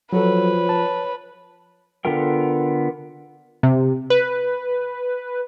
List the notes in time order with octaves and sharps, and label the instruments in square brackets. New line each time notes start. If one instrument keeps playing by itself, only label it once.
[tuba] F3 [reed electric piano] F#3 F#4 A4 [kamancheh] B4 [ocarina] C#5
[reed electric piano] A5
[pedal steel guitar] D3 B3 F4 A#4 G5
[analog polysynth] C3
B4